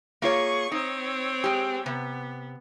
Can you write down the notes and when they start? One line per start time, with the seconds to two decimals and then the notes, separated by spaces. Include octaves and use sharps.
0.22 A#3 F4 G#4 C#5 C#6
0.72 C4 D#4 C#5
1.44 G#3 G4
1.86 C3 B3